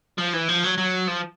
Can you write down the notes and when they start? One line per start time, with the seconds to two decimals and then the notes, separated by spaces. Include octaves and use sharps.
0.18 F3
0.33 E3
0.49 F3
0.64 F#3
0.78 F#3
1.08 F3